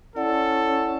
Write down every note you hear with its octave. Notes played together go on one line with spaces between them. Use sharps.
C#4 E4 A4 D5 F#5